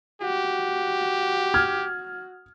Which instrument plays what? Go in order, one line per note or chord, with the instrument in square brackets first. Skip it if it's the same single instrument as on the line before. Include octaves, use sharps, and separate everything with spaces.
[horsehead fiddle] F#4 [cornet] G4
[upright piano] F6 G#6